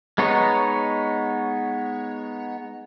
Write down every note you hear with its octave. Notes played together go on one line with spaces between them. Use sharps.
G#3 B3 D#4 C#5